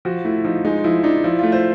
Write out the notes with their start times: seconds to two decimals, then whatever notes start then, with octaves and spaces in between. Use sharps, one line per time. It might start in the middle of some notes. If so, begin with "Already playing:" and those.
0.05 F3 F#4
0.25 A3 E4
0.45 F3 D#4
0.65 G#3 D#4
0.84 F3 E4
1.04 D4 D#4
1.24 F3 E4
1.39 A3 F4
1.52 C5